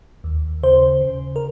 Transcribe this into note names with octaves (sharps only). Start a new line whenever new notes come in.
D#2
C#3 C5
C#3
A#4